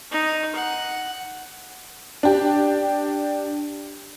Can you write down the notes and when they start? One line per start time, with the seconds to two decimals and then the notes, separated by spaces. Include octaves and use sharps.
0.11 D#4
0.55 F#5
2.23 D4 G4